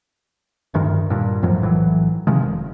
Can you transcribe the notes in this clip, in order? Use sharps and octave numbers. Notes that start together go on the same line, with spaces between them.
D1 D2 G2 D#3
G2 A#2
F2 A2 F3 F#3
B1 A2 E3 F#3
C3 D#3 F3 G#3
F1